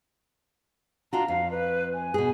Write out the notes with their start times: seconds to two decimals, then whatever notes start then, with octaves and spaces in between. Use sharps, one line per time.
1.13 D4 F4 F#4 A#5
1.28 F2 F5
1.51 B4
1.94 G#5
2.14 B2 G#4